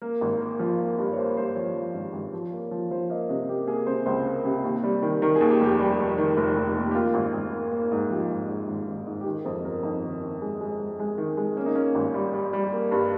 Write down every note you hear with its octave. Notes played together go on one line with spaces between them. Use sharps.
A#3 A#4
G#1
A#3
F3
A#3
G2
C#5
A#3 C5
G2 C5
F3 C#5
F3
G#1
G#1
F3
A#3
F3
F3 C5
A#3 D#5
C3 D#5
A#3 G4
A#3 G#4
C3 C5
C#2 C5
A#3
C3
D#2
G3
D#3
D#3 A#4
G#4
D#2
G4
F1 G4
G3
F1
D#3
F1
F1
D#2
G4
A#3 F4
G#1
G#1
A#3
A#3
G#2
F3 G4
G#2
G#2
G#1
G#1
G#2
G4
D#3 G#4
F2 C5
G1 A#4
F2 D#4
D#3
D#3
G#3
G#3
G#3
G#3
D#3
G#3
A#3 C#4
D#4
A#3 C#4
G#1
G3
G3
G3
A#3
G2